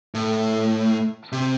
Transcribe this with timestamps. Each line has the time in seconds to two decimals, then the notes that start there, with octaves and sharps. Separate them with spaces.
0.15 A2
1.32 C3